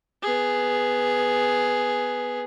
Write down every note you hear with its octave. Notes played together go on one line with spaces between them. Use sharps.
B3 G#4